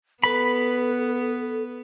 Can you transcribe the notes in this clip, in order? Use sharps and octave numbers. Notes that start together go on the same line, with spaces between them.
B3 A4 B4 B5